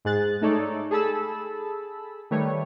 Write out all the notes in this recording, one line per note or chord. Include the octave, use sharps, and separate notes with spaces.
G#2 G#3 G#4 F#6 A6
A3 D#4 A4 C#5 D5
G#4 A4 A5 B5 E6
D#3 G3 A3 B4 C#5